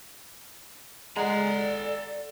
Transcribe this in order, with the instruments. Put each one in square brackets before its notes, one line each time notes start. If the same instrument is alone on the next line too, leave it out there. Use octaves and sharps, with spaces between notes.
[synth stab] G#3 [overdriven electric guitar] A4 A#5 [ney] D5 [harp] F#5 C7